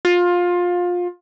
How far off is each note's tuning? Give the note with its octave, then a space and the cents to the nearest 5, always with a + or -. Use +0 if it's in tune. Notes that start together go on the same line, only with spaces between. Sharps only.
F4 +20